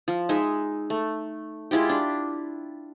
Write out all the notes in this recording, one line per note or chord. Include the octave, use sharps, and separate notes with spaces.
F3
G#3 D#4 E5
A3
G#3 E4 F4 G4
D4